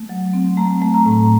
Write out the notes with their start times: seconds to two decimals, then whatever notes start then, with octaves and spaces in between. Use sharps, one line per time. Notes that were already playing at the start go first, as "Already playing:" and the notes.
Already playing: A3
0.09 F#3
0.33 C4
0.57 A3 A#5
0.82 A3
0.94 A#5
1.06 A2